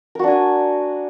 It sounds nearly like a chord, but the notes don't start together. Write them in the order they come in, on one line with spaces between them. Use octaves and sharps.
A#4 F#4 D4 G#5